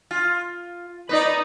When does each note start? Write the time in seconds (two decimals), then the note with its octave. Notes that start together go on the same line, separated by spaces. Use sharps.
0.11 F4
1.09 D#4 B4 D5